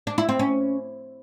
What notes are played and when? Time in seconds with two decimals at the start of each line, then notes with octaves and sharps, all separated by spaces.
0.07 D4
0.18 E4
0.29 C4
0.39 C#4